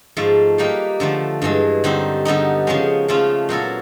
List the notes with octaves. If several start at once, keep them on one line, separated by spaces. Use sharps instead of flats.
G#2 F3 A3
G3 A#3 D#4 G4 B4
D3 F3 A3
G2 E3 G#3
D3 G3 C4 D#4
D3 G3 B3 D#4
C#3 F3 G#3 C#4
C#3 F3 A3 C#4 F4
A#2 F#3 B3 E4 A4